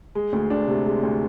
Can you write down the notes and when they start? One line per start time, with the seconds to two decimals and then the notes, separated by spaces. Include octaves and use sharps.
0.15 G#3
0.32 D2
0.50 D4
0.68 C3
0.85 G#3
1.03 D2